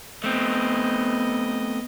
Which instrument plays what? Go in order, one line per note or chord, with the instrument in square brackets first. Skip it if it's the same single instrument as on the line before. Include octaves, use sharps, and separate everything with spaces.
[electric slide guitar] A3 C4 [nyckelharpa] B3 D#5